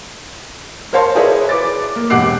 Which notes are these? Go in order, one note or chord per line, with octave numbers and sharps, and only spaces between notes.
A#4 C5 C#5 F5 A5 C6
E4 G#4 A#4 B4 C#5 D5
B4 D6 A6
A#3
E1 G4 F#5 D6 F#6 C7